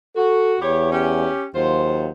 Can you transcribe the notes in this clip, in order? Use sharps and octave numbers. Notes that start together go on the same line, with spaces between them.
F#4 A4
E2 E4 G4 C#5
C#4 G4
D#2 F#3 F4 C5